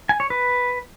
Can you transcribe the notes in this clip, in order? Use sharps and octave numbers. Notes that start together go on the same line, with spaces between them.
G#5
C#5
B4